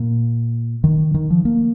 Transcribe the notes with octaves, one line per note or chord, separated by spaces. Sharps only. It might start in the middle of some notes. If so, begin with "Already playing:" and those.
Already playing: A#2
D#3
D#3
F3
A#3